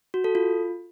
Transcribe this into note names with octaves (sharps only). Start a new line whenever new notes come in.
F#4
A4
F4